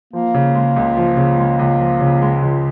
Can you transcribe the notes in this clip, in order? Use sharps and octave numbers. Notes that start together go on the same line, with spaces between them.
F3 A#3
C#3
G#3
C#2
F3
C#3
G#3
C#2
F3
C#3
G#3
C#2